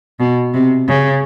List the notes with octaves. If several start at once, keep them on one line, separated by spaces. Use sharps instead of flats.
B2
C3
C#3